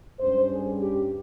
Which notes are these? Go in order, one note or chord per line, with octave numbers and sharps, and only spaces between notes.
G2 G3 C#4 C5
G#4
G4